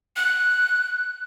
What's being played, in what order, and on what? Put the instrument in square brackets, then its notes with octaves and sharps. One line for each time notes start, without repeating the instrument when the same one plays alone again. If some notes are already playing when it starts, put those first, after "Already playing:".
[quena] F#6